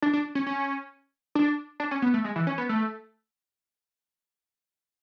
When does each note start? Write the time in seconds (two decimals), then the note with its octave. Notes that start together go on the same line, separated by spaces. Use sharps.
0.02 D4
0.13 D4
0.35 C#4
0.46 C#4
1.35 D4
1.80 D4
1.91 C#4
2.02 B3
2.14 A3
2.24 G#3
2.36 E3
2.47 C#4
2.58 B3
2.69 A3